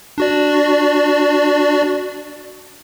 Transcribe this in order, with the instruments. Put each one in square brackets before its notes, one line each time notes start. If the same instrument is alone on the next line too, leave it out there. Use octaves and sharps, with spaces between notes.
[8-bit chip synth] D4 F#4 D5